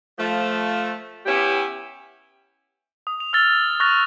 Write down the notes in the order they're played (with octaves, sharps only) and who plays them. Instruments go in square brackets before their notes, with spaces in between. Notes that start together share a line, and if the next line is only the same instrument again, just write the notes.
[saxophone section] F3 A3
B3 C#4 E4 G4
[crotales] D#6
F7
E6 F6 A6 G7
C#6 F6 F#6 A6 A#6 F7